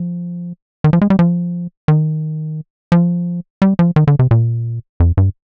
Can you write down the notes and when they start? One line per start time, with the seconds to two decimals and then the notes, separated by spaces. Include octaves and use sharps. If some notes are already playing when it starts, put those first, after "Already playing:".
Already playing: F3
0.84 D#3
0.93 F3
1.01 G#3
1.10 G3
1.19 F3
1.88 D#3
2.92 F3
3.62 G3
3.79 F3
3.96 D#3
4.07 D3
4.19 C3
4.31 A#2
5.00 F2
5.17 G2